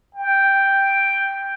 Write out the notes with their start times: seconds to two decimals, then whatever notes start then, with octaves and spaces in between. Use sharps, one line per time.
0.15 G5